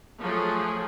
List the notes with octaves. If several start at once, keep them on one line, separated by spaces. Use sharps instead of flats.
F3 F#3 A3 G#4